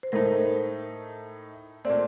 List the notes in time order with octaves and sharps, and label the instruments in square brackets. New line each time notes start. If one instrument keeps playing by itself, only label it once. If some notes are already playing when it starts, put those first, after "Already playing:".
[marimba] C5
[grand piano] A2 A3 D#4 [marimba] A#4
[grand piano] A#2 A3 C4 [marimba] D5